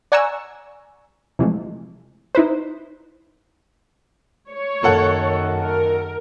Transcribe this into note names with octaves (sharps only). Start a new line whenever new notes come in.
D5 F#5 G#5 A#5 C#6 E6
C3 E3 F3 G#3 A3
D#4 E4 B4 C5
C#5
F#2 D#3 A#3 A4 F#5
A#4